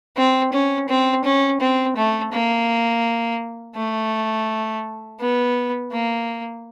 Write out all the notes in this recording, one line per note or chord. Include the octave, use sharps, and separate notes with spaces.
C4
C#4
C4
C#4
C4
A3
A#3
A3
B3
A#3